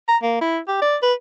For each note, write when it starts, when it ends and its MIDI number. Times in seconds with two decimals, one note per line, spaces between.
0.08 0.17 82
0.23 0.38 58
0.41 0.59 64
0.68 0.77 67
0.82 0.97 74
1.03 1.14 71